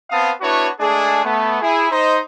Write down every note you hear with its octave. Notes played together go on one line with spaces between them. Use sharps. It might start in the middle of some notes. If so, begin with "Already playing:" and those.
B3 C4 F5 A5 D#6
B3 D4 E4 F#4 B4 C#5
G#3 A3 D4 G#4
A3 B3
E4 G#4
D#4 C5 D#5